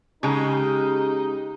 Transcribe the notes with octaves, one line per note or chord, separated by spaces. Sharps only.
C#3 G#3 D#4 G4